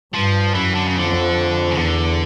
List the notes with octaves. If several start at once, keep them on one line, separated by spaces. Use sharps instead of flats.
G2 F3
F#2 E3
D3
C#3
F2 D3
C#3
E2 D3